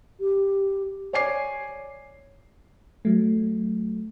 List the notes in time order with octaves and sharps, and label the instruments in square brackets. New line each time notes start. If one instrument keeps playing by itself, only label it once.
[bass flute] G4
[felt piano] C#5 D5 G#5 D6 C7
[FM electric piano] F#3 A3